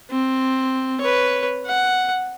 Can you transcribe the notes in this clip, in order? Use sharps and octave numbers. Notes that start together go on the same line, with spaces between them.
C4
B4 C#5
F#5